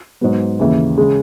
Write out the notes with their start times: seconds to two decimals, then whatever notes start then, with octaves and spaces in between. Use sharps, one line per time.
0.21 G#2 F#3 B3
0.59 D#2 C#3 E3
0.98 C#3 G#3